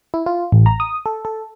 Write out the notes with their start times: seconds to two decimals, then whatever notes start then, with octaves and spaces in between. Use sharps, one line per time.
0.14 E4
0.26 F4
0.52 A1
0.66 A#5
0.80 D#6
1.06 A4
1.25 A4